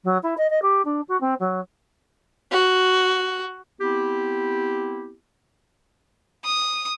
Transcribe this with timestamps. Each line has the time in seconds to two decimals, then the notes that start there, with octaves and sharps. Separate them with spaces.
0.04 F#3
0.23 E4
0.37 D#5
0.50 D#5
0.62 G4
0.85 D4
1.08 F#4
1.20 C4
1.39 F#3
2.51 F#4
3.79 B3 C4 E4 G4
6.44 D#6